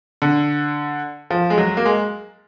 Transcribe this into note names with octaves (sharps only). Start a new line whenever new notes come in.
D3
F3
G#3
F#3
A#3
G#3